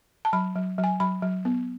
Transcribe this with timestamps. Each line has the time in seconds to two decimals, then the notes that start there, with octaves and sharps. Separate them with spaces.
0.25 A5
0.33 F#3 B5
0.56 F#3
0.78 F#3
0.84 G#5
1.00 F#3 B5
1.22 F#3
1.45 B3